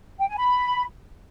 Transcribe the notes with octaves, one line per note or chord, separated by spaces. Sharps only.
G5
G#5
B5